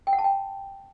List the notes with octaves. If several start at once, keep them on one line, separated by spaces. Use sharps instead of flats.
G5
F#5
A5
G5